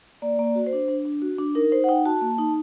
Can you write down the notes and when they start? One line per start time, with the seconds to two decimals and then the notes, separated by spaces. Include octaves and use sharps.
0.22 A#3 D5
0.39 A#3
0.44 D5
0.55 F#4
0.66 C5
0.73 D4
0.88 D4
1.06 D4
1.22 F#4
1.38 D4
1.55 D#4 A#4
1.72 D#4 C5
1.84 F#5
1.89 D#4 G5
2.06 F#4 A5
2.21 A#3
2.38 D#4